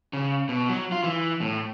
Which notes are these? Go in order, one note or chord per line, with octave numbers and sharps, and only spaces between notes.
C#3
B2
F#3
F4
E3
A2